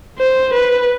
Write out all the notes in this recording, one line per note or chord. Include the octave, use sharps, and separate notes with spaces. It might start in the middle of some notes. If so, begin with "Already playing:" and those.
C5
B4